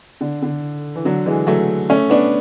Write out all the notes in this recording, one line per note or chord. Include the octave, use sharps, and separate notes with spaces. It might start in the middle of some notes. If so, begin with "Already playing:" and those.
D3
D3
E3
D3 F#3
E3 G#3
F#3 A3
A3 C#4
B3 D4